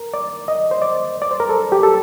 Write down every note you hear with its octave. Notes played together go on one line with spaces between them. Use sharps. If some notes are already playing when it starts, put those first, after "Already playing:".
Already playing: A#4
D5
D#5
C5
D5
D5
C5
A#4
A4
G4
A4